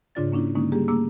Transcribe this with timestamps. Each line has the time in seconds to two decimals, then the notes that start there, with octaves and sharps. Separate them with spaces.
0.15 G#2 C#3 D4 F4 D5 A6
0.32 A#3 C#4 D4 E4
0.55 D3 G#3 A#3 C#4 D#4
0.72 G3 A#3 G4 G#4
0.88 A3 A#3 G#4 A#5 D6 E6